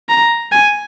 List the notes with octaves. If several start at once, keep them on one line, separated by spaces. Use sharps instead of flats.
A#5
G#5